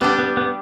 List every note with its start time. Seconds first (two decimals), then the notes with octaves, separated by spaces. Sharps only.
0.01 G3 B3 D4 G4
0.19 B3
0.37 B3